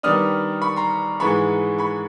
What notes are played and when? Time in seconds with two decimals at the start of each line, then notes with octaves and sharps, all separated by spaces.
0.03 D#3 G3 B3 D4 D#6 F6
0.62 B5 C#6
0.76 A#5 C6
1.20 G#2 E3 G#3 B5 C#6
1.79 B5 C#6